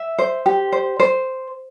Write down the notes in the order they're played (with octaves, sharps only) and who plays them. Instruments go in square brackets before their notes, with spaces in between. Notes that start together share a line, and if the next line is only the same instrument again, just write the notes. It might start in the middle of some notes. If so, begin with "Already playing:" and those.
Already playing: [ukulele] E5
C5
G4
C5
C5